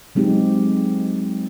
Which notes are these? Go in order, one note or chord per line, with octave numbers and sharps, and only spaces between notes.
F#3 G#3 C4 D#4 G4